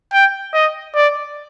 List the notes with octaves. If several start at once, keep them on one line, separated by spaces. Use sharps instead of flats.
G5
D#5
D5